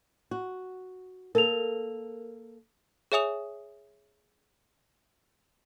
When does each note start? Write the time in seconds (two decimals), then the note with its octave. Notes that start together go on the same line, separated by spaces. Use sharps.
0.31 F#4
1.35 A#3 A4 A#4 F7
3.12 G#4 C#5 E5 G#5 D#6 F7